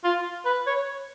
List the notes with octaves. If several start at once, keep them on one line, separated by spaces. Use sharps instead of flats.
F4
B4
C#5